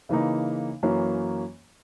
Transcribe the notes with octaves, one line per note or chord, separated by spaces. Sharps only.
C#3 E3 A#3 D#4
F#2 E3 A#3 C#4